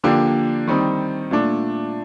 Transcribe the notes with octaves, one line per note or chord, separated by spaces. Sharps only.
D3 F3 A#3 D4 G4
D#3 G3 C4 D#4
A#2 A3 D4